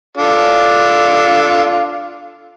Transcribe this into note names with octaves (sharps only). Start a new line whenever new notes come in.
D4 F4 A4